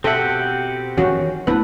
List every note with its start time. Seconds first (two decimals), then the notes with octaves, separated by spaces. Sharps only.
0.04 B2 C4 G4 A4 E5 F#5
0.97 D#3 E3 C#4 F#4
1.47 D1 A3 B3 D4 E4 B4